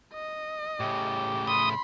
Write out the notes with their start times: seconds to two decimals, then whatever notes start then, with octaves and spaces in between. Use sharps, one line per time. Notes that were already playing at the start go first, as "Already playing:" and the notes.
0.13 D#5
0.80 A2 C#3 G4
1.47 B5 C6 D#6